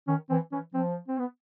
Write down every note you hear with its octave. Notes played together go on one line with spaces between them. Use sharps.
D#3 C#4
E3 C4
E3 C#4
F3 C4
C4
B3